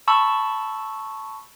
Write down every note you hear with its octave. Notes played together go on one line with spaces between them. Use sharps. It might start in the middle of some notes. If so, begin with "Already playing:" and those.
A5 B5 C#6 E6